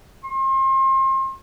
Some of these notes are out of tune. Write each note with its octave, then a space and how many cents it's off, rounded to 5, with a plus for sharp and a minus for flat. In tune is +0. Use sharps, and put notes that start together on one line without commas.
C6 +35